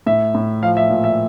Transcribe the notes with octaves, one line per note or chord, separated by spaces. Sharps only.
A2 E5
A2
F3 F5
E5
A#2
E5